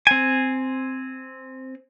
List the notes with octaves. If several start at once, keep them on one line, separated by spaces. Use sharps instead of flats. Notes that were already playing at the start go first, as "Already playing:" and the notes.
C4 G#5